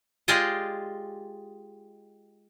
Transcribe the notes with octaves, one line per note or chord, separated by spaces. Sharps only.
G#3 F4 G4 G#4 D5 D#5